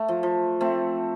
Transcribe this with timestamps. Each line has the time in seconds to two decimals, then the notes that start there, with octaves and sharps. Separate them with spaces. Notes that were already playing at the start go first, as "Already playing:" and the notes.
Already playing: A3
0.08 F3
0.23 F3
0.61 A3 C4